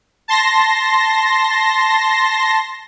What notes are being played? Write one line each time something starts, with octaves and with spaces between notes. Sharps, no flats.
A5 C6 A#6